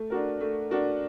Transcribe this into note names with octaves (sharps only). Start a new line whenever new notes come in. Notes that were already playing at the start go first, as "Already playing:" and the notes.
Already playing: A3
D4 F#4 A#4
A3
D4 F#4 A#4